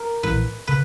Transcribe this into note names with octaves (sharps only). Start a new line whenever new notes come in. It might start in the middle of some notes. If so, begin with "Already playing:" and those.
Already playing: A#4
A#1 A2 E3 B4
C#3 B4